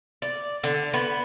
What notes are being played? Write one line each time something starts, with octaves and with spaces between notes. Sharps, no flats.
D5
D3
B3